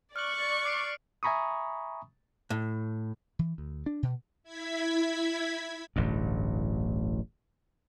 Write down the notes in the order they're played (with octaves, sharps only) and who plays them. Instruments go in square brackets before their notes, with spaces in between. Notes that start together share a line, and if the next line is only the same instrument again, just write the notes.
[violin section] D5 C#6 [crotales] F6 F#6 F#7
[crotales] D6 C7 D7
[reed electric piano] E5 G#5 A#5 B5 C#6 D#6
[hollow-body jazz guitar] A2
[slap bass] E3
D2
D4
B2
[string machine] E4 G#6 B6
[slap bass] D1 A1 G2